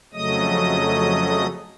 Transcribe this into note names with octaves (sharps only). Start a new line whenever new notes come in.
F2 C#3 F#3 A3 D#5 D#6